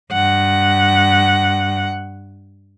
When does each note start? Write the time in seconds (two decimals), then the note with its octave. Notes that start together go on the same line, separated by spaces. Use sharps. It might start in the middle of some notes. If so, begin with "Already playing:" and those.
0.12 G2 F#5